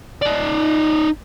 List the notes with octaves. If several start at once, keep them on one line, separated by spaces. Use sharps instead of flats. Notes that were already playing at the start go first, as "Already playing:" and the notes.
D#4 D5